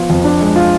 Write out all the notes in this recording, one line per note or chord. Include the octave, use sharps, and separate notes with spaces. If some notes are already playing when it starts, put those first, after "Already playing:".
Already playing: F3 B3 F4
F2
D4
G#3
F4